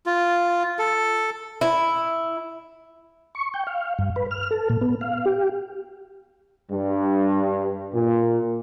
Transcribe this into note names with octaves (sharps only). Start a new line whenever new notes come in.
F4
A4
E4
C#6
G5
F5
G2
B4
F6
A4
A#2
B3
F5
G4
G2
A#2